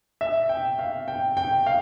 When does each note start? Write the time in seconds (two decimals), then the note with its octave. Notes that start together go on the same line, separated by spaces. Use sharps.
0.21 E5
0.49 G5
0.79 F5
1.08 G5
1.37 G5
1.66 F5